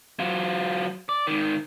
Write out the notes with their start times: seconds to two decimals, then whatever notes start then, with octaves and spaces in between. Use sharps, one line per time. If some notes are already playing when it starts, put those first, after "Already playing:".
0.20 F#3 F4
1.09 D5
1.27 G#2 D#3